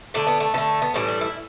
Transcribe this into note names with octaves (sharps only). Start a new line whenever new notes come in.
D3 A3 D4
B3
A3
D3 A3 B3
B3
A2 E3 G3 C#4
D4
E4